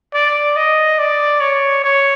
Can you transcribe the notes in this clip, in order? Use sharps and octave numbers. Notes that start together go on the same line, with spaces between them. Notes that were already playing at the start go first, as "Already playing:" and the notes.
D5
D#5
D5
C#5
C#5